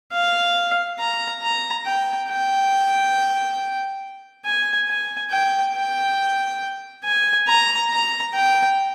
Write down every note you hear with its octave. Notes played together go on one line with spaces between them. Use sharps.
F5
A#5
A#5
G5
G5
G#5
G#5
G5
G5
G#5
A#5
A#5
G5